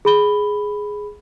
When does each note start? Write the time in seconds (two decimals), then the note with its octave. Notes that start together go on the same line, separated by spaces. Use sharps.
0.05 G#4 B5 G7